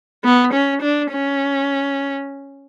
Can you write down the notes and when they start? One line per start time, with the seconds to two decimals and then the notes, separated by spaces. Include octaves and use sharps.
0.24 B3
0.53 C#4
0.82 D4
1.11 C#4